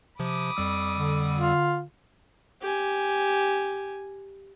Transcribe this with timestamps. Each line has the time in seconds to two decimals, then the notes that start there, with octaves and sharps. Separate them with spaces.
0.19 C3 F3 B5 D6 D#6
0.57 F2 G3 E6
0.98 D3
1.37 F4
2.62 G4 G#5